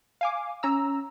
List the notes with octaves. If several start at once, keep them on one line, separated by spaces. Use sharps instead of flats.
F5 G#5 D6
C#4 A#5 E6